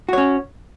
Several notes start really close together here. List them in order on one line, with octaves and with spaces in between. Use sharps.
F#4 C#5 C#4